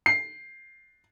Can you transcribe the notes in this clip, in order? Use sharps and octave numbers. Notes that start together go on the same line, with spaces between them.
C7